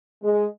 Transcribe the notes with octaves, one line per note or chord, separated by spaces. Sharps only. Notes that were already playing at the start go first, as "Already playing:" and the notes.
G#3